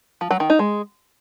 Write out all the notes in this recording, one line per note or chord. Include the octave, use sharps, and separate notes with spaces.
F3
F#3
D#3
D#4
G#3